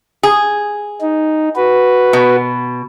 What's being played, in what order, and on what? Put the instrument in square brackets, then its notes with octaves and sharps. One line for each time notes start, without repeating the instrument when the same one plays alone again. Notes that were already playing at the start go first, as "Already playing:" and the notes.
[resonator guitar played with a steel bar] G#4
[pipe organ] D#4
F#4 B4
[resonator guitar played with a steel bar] B2